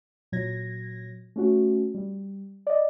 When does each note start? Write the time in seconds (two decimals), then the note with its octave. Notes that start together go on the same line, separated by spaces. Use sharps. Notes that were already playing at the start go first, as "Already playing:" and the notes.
0.32 A#2 F#3 G#6 A#6
1.36 A3 C#4 F#4
1.94 G3
2.67 D5 D#5